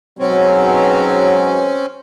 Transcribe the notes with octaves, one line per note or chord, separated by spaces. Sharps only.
G#2 B2 F#3 C4 C#4